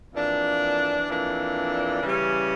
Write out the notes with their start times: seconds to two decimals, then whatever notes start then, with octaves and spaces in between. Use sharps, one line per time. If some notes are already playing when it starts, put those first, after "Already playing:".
0.14 F2 E3 A#3 D4
1.08 F2 E3 A#3 D4
2.02 C#3 E3 G3 C#4